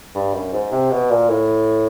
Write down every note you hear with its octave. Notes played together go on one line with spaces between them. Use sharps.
G2
F#2
G#2
C3
B2
A#2
A2